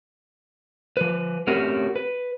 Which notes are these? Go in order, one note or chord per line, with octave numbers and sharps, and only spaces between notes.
F3 B4
A3 C4 C#4 F#4 G4 A#4
B4